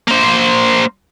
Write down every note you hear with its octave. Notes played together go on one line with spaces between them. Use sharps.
A#3 C5